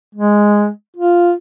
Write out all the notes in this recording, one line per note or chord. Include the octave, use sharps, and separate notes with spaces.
G#3
F4